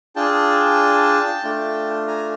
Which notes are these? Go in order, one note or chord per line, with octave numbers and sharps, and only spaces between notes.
D4 F4 G#4 G5 A5
A3 D4 F4
G#5 A#5